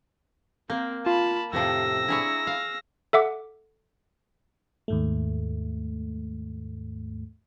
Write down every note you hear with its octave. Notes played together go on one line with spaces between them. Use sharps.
A#3 C4 A#4 G6
F4 A5 B5
F2 A2 C3 F3 G4 E6 A#6 C7
D4 E4 G#4 C#5 A#5 B5
F5
A4 E5 F#5 D6
D#2 G#2 A3